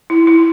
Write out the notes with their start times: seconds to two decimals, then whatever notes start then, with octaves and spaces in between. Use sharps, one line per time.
0.10 E4
0.27 E4